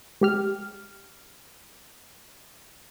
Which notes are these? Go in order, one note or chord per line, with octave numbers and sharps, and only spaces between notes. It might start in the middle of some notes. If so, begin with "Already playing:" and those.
G#3 G4 F6